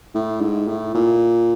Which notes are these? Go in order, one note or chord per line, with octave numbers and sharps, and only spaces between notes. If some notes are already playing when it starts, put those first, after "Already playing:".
A2
G#2
A2
A#2